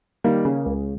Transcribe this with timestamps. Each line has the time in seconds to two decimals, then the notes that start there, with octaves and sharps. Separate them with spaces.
0.24 D#3 G3 A#3
0.45 C#3
0.66 C#2